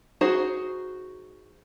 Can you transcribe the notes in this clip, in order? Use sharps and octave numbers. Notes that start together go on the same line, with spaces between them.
D#4 F#4 G#4 C5